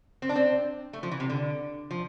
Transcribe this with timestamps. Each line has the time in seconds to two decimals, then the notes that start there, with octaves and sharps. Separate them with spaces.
0.22 C4
0.29 D4
0.36 C4
0.93 A3
1.03 F3
1.11 E3
1.20 C3
1.30 D3
1.91 F3